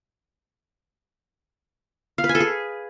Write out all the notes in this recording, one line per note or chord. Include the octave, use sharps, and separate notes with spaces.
F5
B4
G#5
A4
G#4